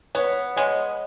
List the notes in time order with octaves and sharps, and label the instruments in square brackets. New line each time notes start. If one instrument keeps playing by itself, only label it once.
[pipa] B3 [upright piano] C#5
[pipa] G#3 [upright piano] C#5